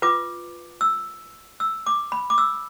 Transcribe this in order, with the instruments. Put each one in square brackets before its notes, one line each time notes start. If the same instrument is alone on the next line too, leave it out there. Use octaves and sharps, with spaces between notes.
[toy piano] F4 B4 D6
E6
E6
D6
B5
D6
E6